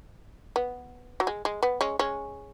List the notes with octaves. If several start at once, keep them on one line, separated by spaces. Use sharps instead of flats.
B3
F#3
G#3
G#3
B3
G#3 C#4
G#3 C#4